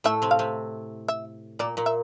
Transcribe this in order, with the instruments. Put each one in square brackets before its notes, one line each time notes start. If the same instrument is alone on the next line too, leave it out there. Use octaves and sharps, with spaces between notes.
[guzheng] A2 A3 [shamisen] E5
[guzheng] C3 C4
[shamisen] F5
[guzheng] C3 C4
[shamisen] E5
[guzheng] A#2 A#3 [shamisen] D5
[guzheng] A#2 A#3
[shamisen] E5